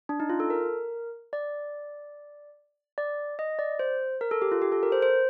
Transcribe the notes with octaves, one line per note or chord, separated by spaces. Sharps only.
D4
D#4
F4
A4
A#4
D5
D5
D#5
D5
C5
A#4
A4
G4
F4
G4
A4
A#4
C5
C5